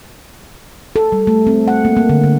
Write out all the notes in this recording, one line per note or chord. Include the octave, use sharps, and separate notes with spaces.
A4
G3
A3
C4
F#5
A#3
A#3
D3
D3